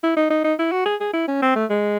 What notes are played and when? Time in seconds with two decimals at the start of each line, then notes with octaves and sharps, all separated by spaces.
0.03 E4
0.16 D#4
0.30 D#4
0.44 D#4
0.59 E4
0.72 F#4
0.86 G#4
1.01 G#4
1.13 E4
1.28 C#4
1.42 C4
1.56 A3
1.70 G#3